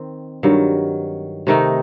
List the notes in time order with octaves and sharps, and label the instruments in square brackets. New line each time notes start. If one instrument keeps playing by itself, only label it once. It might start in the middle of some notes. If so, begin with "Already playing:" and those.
Already playing: [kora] D#3 C4
G2 D#3 F#3
C3 D#3 A3 D#4